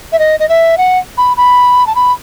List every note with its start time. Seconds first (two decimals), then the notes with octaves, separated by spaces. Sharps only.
0.12 E5
0.19 D#5
0.40 D#5
0.49 E5
0.78 F#5
1.18 B5
1.37 B5
1.87 A5
1.96 B5